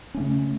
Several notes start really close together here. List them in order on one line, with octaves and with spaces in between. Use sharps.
C#4 A3 C#3